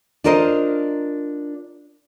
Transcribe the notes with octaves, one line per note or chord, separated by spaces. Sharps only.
D4 F4 A#4 C5 D#5